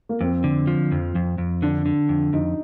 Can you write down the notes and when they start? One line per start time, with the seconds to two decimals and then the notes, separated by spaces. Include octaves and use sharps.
0.09 A#3
0.21 F2 C4
0.44 D3
0.67 F3
0.92 F2
1.15 F2
1.38 F2
1.62 D3 D4
1.86 D3
2.09 F2
2.33 F2 D#4